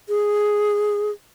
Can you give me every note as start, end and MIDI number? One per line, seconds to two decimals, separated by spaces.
0.09 1.11 68